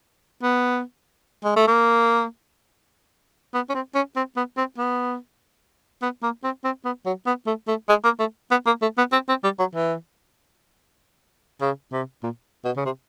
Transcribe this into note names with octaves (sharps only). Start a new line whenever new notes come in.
B3
G#3
A3
A#3
B3
C#4
C4
C#4
C4
B3
C4
B3
B3
A#3
C4
C4
B3
F#3
B3
A3
A3
G#3
A#3
A3
B3
A#3
A3
B3
C4
C4
G3
F#3
E3
C#3
C3
A#2
B2
C#3
C3